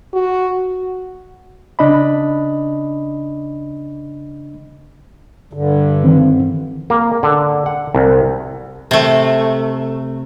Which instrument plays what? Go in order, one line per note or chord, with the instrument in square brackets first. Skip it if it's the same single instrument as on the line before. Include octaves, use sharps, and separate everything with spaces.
[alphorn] F#4
[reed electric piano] C#3 D4 D#5 B5
[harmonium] G2 D3
[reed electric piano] D#3 E3 C4
[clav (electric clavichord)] A#3
D3
F#5
C2
[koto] C3 A3